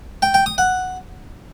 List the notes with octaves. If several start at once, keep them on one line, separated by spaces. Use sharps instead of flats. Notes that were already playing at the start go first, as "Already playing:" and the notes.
G5
G5
D#6
F#5